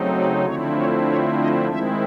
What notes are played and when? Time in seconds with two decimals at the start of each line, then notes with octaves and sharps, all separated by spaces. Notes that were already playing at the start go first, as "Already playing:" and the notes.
Already playing: C#3 F#3 A3 C4 D#4
0.16 D5
0.46 D3 F3 A3 C4 E4 C#5
0.76 C#5
1.07 C#5
1.39 D#5
1.69 D#3 G#3 C4 E4 E5